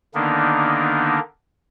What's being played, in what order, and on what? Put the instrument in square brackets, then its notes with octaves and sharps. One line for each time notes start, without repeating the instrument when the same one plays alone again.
[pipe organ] D3 D#3 A#3 B3 D4 D#4